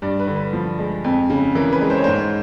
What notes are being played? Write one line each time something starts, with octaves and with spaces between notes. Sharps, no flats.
G2 D5
B4
D3
B4
F3
G#3
F2
C#3
E3 A#4
B4
G#3
C5
C#5
G#2 C5